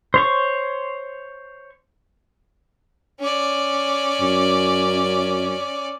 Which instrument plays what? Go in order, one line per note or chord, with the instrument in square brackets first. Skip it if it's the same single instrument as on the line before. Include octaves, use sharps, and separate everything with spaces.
[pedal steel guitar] C5 C#5 C#6
[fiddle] C#4 D5
[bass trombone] F#2